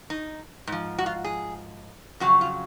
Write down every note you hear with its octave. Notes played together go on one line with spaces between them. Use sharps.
D#4
G#2 F3
F#4
F4
G#4
F2 C#3 F#3 F#4
F4